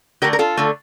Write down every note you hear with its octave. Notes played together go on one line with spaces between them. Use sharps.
D3 A3 G4 A#4
A#4
F4 A4
D3 A3